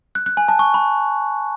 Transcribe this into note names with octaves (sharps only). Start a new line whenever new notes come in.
F#6
F#6
G#5
A5
C#6
B5